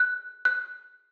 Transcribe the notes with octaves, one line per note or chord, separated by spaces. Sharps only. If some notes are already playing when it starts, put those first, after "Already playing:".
Already playing: F#6
F#6